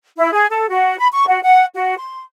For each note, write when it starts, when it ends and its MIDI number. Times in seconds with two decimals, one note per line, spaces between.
0.18 0.30 64
0.33 0.46 68
0.50 0.67 69
0.69 0.98 66
0.99 1.08 83
1.13 1.25 85
1.28 1.39 66
1.43 1.65 78
1.75 1.95 66
1.98 2.23 84